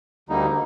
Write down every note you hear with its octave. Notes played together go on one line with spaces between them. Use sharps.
D2 D3 G3 A#3 D#4